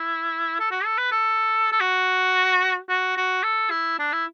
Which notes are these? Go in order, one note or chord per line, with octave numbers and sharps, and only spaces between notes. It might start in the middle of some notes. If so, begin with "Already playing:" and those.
Already playing: E4
A4
F#4
A4
B4
A4
A4
F#4
F#4
F#4
A4
E4
D4
E4